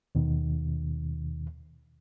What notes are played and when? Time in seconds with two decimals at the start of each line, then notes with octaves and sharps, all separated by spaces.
0.15 D#2 B2 D#3